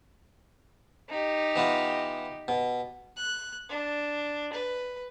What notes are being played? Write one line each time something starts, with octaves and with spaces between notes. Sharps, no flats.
D#4 G4
E3 B3 F4
B2
F#6
D4
B4